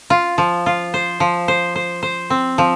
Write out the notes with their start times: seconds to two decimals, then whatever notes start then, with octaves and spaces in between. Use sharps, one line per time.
0.10 F4
0.38 F3
0.66 F4
0.94 C5
1.20 F3
1.48 C5
1.76 C5
2.03 C5
2.30 C4
2.58 F3